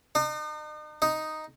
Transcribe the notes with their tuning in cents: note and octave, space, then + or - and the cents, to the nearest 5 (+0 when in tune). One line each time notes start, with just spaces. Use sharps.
D#4 -40
D#4 +0